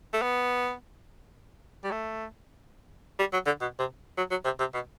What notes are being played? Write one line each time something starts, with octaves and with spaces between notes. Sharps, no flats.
A3
B3
G3
A3
G3
F#3
D3
B2
C3
F#3
F#3
C3
C3
B2